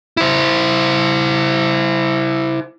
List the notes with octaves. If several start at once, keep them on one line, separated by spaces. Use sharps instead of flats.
E4 C5